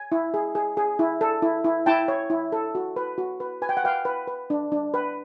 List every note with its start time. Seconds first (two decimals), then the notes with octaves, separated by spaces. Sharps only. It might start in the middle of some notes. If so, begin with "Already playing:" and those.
Already playing: G#5
0.12 E4
0.34 G#4
0.55 G#4
0.77 G#4
0.99 E4
1.21 A4
1.42 E4
1.64 E4
1.86 E4 G5 A5
2.08 C#5
2.30 E4
2.52 A4
2.75 F#4
2.96 B4
3.18 F#4
3.40 B4
3.62 B4 G#5
3.69 G5
3.77 F#5
3.84 B4 F5 G5
4.05 B4
4.27 B4
4.50 D4
4.72 D4
4.94 B4